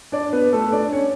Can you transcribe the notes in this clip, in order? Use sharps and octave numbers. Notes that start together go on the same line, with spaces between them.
D4 D5
B3 B4
A3 A4
D4 D5
C#4 C#5